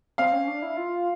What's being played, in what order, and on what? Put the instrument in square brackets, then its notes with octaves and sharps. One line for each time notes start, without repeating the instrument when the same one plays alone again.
[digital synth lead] C4 [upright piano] F5
[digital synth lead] C#4
D4
E4
F4